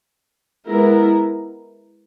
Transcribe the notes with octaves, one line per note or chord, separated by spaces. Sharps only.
G#3 B3 E4 A#4